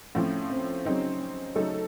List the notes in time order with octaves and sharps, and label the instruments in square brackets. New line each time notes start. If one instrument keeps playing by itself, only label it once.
[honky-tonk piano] A2 F3 C4 [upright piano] C#4
[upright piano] C4
[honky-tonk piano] C#3 F#3 C4 D#4 [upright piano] C#4
[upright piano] C#4
[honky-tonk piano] C#3 F#3 A3 D#4 A4